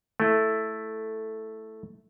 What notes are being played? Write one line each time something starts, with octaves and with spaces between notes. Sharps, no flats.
A3 E4